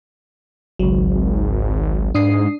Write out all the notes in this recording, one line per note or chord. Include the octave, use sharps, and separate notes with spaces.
G#1 C#2 F#3
G#2 D4 D#6 C7